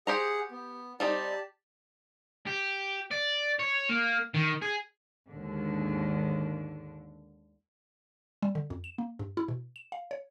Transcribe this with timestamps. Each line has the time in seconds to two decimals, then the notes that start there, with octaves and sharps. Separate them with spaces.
0.07 G4 G#4 C5 F#5 A#5
0.51 B3
1.00 G3 C4 D#4 G4 D5 A5
2.46 G4
3.11 D5
3.59 C#5
3.90 A#3
4.34 D#3
4.62 G#4
5.30 D#2 G#2 D3
8.43 G3
8.55 D3
8.70 F2
8.84 E7
8.98 A#3
9.19 G2
9.37 E4
9.48 B2
9.76 E7
9.92 F5
10.11 C#5